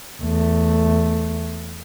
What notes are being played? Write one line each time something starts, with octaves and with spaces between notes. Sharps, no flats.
E2 A3